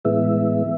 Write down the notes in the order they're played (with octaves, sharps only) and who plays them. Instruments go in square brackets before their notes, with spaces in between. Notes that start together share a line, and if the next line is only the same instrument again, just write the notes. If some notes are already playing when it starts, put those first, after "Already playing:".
[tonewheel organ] A2 E3 G#3 B3 E5